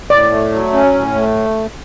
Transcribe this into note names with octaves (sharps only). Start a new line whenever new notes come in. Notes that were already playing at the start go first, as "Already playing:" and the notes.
A2 D5
A3
F#3
C#4
A2
A3